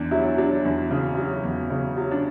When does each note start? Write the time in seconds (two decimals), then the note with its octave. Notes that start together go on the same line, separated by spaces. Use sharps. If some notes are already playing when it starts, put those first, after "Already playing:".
Already playing: E2 D4
0.11 F#3 E4
0.38 F#3 D4
0.65 E2
0.91 C#3
1.17 F#3
1.44 E2
1.70 C#3
1.97 F#3
2.11 D4